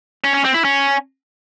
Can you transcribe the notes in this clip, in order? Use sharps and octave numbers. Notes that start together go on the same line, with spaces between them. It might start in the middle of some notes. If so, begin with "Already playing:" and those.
C#4
C#4
C4
E4
C#4